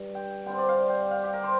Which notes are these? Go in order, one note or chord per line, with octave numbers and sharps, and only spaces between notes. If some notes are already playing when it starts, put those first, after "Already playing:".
Already playing: G2
G5
D3 G3 C4 G5
D5
F5
G5
F5
G4
A#4
C5